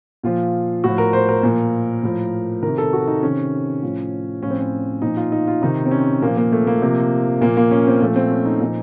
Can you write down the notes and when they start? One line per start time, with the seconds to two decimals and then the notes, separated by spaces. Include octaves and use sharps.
0.23 A#2 F3 F4
0.84 A2 F3 F#4
0.98 A#4
1.13 C5
1.29 A#4
1.43 A#2 F3
2.03 A2 F3
2.63 D#3 A#4
2.68 C3
2.78 A4
2.93 F#4
3.07 D#4
3.22 C3 D#3 C#4
3.82 A2 F3
4.43 A2 F3 C#4
4.51 C4
4.59 C#4
5.02 A#2 F3 D#4
5.17 F4
5.32 D#4
5.47 F4
5.62 C3 D#3 D#4
5.85 C4
5.91 C#4
6.22 A#2 F3 A#3
6.37 A#3
6.52 A3
6.67 A#3
6.82 C3 F3
7.41 A#2 F3 A#3
7.57 A#3
7.71 C#4
7.87 C4
8.01 A#2 F3 A3
8.16 C4
8.31 C#4
8.46 D#4
8.61 A#2 F3 D#4